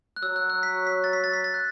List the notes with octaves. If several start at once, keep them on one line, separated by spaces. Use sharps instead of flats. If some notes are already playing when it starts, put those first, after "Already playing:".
F#6
F#3 E6
F#6
F#6
B6
B6
A6
B6
A6
B6
A6
F#6